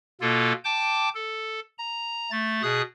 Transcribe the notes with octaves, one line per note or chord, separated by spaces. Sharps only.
B2 A#3 F4 A4
G5 A5 D6 G6
A4
A#5
A3 A6
B2 G#4 D#6 F#6